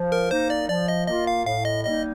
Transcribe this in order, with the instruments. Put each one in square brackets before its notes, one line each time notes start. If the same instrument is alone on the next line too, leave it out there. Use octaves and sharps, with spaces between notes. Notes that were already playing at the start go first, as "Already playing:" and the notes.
Already playing: [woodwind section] F3
[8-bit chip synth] A#4
[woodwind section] A#3 D#4 [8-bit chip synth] C5
[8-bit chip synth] D5
[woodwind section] F3 [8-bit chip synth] D5
[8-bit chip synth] D#5
[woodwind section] A#3 F4 [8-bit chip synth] D#5
[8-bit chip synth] F5
[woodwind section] A2 [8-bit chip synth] F5
[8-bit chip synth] D#5
[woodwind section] G3 A#3 D#4 [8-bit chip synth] D#5